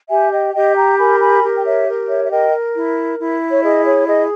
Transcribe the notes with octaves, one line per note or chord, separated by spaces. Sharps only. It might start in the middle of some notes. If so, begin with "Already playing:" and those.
G4 E5 G#5
D#5 G5
G4 D#5 G5
G5 A#5
A#4 G#5 B5
G#5 B5
G4
G5
C#5 E5
A#4
C#5 E5
E5
A#4 D#5 G5
E4
E4
C#5
G#4 D#5
C#5
G#4 D#5